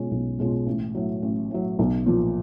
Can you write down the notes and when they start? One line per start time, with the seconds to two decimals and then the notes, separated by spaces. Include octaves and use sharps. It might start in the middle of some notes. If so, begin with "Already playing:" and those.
Already playing: B2 G#3 C#4 F4
0.11 B1
0.39 B2 G#3 C#4 F4
0.66 A1
0.95 A2 F#3
1.22 A1
1.51 A2 F#3
1.79 B1
2.06 A#2 F3